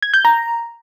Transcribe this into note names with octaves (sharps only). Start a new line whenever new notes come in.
G#6
G6
A#5